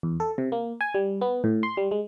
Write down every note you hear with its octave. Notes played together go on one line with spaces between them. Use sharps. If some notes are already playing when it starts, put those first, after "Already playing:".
E2
A4
C3
A#3
G#5
G3
B3
A2
C6
G3
G#3